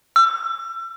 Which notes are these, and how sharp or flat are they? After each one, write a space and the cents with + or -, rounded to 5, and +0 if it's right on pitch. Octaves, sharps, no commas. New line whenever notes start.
E6 +35